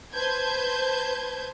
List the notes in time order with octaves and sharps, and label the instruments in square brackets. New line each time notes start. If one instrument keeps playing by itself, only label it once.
[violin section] B4 C5 A5 G6 G#6